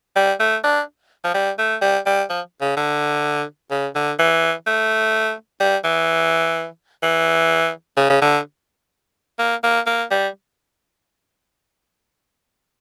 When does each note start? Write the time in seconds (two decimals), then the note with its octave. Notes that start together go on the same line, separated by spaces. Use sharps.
0.16 G3
0.40 A3
0.64 D4
1.24 F3
1.34 G3
1.59 A3
1.82 G3
2.06 G3
2.30 F3
2.62 C#3
2.77 D3
3.71 C#3
3.95 D3
4.19 E3
4.67 A3
5.60 G3
5.84 E3
7.03 E3
7.97 C#3
8.10 C#3
8.22 D3
9.39 A#3
9.63 A#3
9.87 A#3
10.11 G3